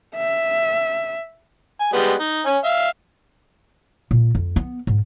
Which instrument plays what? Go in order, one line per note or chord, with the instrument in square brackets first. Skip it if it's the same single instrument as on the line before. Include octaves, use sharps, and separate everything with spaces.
[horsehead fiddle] E5
[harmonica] G#5
G3 G#3 B3
D#4
C#4 G#5
E5 F5
[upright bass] A#2
F2
B3
G#2